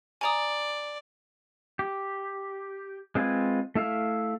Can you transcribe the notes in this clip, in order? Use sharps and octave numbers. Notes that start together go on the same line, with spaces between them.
D5 G#5 A#5 D#6
G4
G#3 C4 F4 B4 G#5
A3 E4 E5 F5